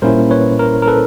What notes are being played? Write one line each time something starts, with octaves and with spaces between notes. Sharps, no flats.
A#2 G3 A#3 C#4 E4 A#4 C5
B4 C#5
A#4
A#4
A4 B4